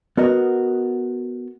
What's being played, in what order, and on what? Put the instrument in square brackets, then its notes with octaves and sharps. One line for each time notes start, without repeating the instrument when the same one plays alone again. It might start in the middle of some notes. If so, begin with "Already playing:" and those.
[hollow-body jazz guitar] B3 F#4 A#4 D#5